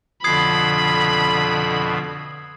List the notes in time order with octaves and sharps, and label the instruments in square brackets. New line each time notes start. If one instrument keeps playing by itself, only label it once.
[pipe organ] F2 B2 F3 [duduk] D3 [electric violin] B5 [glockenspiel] D#6 G#6 C7